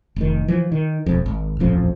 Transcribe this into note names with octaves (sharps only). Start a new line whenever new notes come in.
F1 D#3
E3 F3
D#3
E1 F2
G#1
D#1 A1 F2 F3